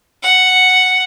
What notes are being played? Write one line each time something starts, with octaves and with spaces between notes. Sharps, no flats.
F#5